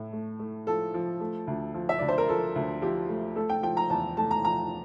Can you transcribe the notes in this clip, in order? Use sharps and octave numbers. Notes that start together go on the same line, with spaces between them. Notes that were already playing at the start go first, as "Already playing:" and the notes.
Already playing: A2 A3
A3
A3
F3 A4
F3
A3
D2
F3
E5
D2 D5
C5
A#4
F3 A4
D2
F3 G4
A3
A3 A4
G5
F3 G5
A#5
E2 A5
A3 A5
A#5
F3 A#5